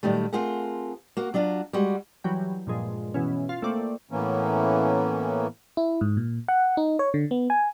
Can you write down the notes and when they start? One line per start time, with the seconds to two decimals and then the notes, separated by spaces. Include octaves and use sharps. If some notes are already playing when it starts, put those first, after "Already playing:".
0.03 A#2 D#3 F#3 G3 A3
0.33 A3 C4 F4 G#4 A#4 F#5
1.17 A#3 F#4
1.34 F#3 D4 F4 F#4
1.73 G3 G#3 F#4 F#5
2.24 E3 F#3 G3 G5
2.67 G2 A#2 F3 G#3
3.14 B2 E3 C#4
3.49 F4
3.62 A3 A#3 C4 D5
4.11 A2 E3 A#3 B3 C#4
5.77 E4
6.01 G#2
6.17 A#2
6.48 F#5
6.77 D#4
6.99 C#5
7.14 D3
7.31 B3
7.50 G#5